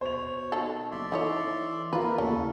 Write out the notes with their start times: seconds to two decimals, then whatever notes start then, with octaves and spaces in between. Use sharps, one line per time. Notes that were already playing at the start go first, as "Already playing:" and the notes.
0.01 B2 C5 C#5 F7
0.52 D#3 A4
0.92 F#1 D5 E5 C6
1.12 E3 D#4 A4 C#5
1.93 E3 A#3 F4 A#4 B4
2.18 D#2 C#3 A3 C#4 A4